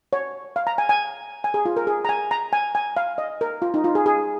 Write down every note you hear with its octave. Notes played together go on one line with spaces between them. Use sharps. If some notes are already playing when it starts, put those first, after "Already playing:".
C#5
F5
A#5
G#5
G#5
G#5
G#4
F4
A#4
G#4
A#5
G#5
A#5
G#5
G#5
F5
D#5
A#4
F4
D#4
F4
G#4
G#4